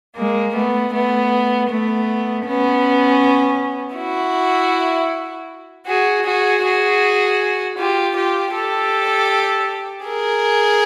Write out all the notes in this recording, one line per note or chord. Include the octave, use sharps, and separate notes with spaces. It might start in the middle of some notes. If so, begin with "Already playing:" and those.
G#3 A#3
A3 B3
A3 B3
A3 B3
B3 C#4
E4 F#4
F#4 G#4
F#4 G#4
F#4 G#4
F4 G4
F4 G4
G4 A4
G#4 A#4